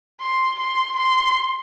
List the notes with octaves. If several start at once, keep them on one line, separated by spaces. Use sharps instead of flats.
C6
C6
C6